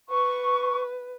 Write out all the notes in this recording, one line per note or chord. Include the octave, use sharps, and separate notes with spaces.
B4 C#6